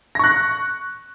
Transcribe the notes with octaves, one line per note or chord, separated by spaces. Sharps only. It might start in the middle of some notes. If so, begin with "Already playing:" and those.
C#6 F#6 A#6